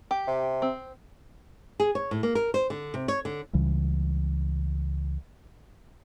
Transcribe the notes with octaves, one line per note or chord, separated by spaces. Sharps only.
G4
C3
C4
G#4
C#5
A2
A#3
A#4
C5
D3
C3
C#5
D3
C#2 C#3 E3 G3